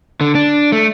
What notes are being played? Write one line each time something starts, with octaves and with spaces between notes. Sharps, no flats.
D3
D4
A3